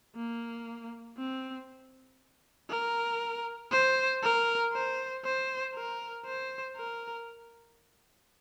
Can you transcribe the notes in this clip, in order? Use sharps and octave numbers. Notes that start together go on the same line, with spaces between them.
A#3
C4
A#4
C5
A#4
C5
C5
A#4
C5
A#4